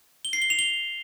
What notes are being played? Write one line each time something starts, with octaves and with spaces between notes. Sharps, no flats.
G7
C7
G7
F7
G7